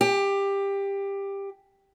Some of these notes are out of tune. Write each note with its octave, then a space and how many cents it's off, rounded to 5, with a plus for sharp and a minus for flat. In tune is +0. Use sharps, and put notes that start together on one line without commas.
G4 +15